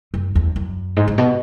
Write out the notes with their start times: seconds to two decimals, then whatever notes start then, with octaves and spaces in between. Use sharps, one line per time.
0.14 F#2
0.35 E2
0.56 F#2
0.96 G#2
1.08 G#2
1.18 B2